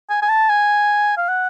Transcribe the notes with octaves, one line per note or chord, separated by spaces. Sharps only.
G#5
G#5
A5
G#5
F5
F#5